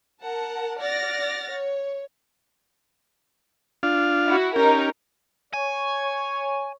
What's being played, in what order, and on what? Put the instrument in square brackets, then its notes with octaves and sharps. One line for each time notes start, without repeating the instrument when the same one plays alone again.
[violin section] A#4 F#5 A5
D5 F#5 F6 A6 A#6
C#5
[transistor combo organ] D4 F4 F5
[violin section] E4 F#4
[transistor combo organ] C#4 G4 [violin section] D#4 A#4
[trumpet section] C#5 [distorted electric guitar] G#5